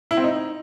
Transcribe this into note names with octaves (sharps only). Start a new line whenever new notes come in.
E4
C4
D#4